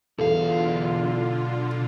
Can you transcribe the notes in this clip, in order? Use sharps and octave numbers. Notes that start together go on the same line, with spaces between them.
B1 E2 D3 F4 A4 F5